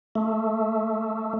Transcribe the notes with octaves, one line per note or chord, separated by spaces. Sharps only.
A3